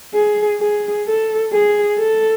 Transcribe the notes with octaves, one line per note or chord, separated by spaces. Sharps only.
G#4
G#4
A4
G#4
A4